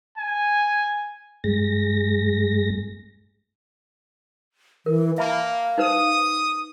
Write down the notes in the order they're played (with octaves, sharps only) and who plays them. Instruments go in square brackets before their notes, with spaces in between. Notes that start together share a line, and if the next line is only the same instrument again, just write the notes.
[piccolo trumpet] G#5
[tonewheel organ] G2 G#3 A#6
[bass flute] E3 [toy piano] A#4
[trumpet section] A#3 [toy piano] E5 A5 B5 [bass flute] F5
[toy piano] D#4 B4 C5 [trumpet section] D#6